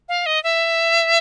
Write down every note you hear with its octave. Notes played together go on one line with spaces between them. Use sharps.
F5
D#5
E5